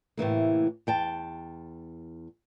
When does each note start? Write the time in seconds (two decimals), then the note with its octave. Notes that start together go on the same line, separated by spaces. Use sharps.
0.17 A2 C3 E3 A#3
0.87 E2 G5 A5